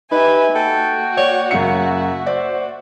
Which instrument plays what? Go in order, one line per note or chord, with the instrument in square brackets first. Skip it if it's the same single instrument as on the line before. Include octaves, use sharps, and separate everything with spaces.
[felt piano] D#4 [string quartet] G4 E5 G#5 [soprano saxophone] B4
[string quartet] A#3 F#4 [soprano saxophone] A4 [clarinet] G5
[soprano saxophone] C#5 [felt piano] D5
[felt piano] F#2 C#3 C#7 [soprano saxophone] E5
[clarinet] C5 [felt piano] D5